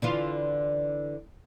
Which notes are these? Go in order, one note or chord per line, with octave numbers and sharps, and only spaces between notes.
D3 E3 F4